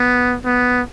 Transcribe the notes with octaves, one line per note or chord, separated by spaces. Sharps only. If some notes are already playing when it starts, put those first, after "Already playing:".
Already playing: B3
B3